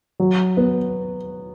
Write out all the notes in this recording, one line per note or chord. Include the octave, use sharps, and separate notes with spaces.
F#3
B3